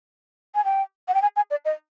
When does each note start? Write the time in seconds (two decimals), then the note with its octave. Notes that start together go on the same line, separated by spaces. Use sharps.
0.55 G#5
0.65 G5
1.08 F#5
1.14 G5
1.22 G#5
1.36 G#5
1.51 D5
1.65 D#5